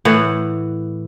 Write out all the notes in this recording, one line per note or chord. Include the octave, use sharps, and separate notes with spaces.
A2 E3 F#5